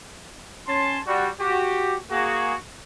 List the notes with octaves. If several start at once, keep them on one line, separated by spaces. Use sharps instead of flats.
C#4 A5 C6
G3 F#4
F#4 G4
A#3 F#4 G#4